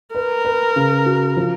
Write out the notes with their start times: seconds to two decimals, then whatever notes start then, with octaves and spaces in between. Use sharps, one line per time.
0.15 A#4 B4
0.45 B4
0.76 C#3
1.06 F#4
1.37 F3